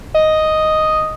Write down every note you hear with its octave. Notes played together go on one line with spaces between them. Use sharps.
D#5